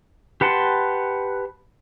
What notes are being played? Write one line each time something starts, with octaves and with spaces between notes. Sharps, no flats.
G4 B4 F#5 A5 C6